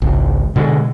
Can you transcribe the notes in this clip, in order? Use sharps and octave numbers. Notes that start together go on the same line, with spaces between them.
G#1 C#2
B2 D3 G#3